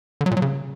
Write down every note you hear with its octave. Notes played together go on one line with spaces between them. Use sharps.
D3
F#3
A#2
F#3
C#3